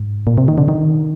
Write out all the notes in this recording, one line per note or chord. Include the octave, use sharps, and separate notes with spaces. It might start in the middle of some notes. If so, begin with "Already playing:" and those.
Already playing: G#2
A#2
C3
D#3
D3
D#3